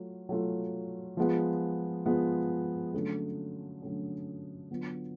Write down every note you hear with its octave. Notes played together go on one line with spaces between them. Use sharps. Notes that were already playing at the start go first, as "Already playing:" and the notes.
Already playing: F#3 A3 F4
F#3 A3 F4 A4
F3 G#3 B3 F4
F3 G#3 B3 F4
D3 F#3 A3 C#4
D3 F#3 A3 C#4
D3 F#3 B3 F4